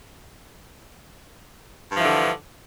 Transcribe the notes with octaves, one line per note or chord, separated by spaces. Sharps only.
G2 D3 E3 F3